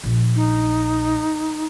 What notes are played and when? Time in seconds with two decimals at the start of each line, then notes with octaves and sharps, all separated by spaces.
0.04 A#1
0.35 D#4